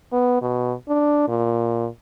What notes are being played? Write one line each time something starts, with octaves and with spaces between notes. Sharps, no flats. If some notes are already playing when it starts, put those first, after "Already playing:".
B3
B2
D4
A#2